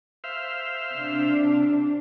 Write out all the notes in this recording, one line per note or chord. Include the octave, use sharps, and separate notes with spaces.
C5 E5 F5
C3 D4